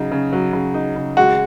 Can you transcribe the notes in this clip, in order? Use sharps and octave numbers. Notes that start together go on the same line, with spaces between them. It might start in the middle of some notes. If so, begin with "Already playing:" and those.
Already playing: C#3 F#3 D#4
C#3
F#3
C#3
D#4
C#3
G#3 F#4